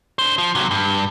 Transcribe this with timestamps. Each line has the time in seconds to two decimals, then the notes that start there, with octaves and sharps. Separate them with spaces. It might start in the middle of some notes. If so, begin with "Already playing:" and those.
0.19 D4 C5
0.38 F3
0.55 C3 F#3
0.71 G2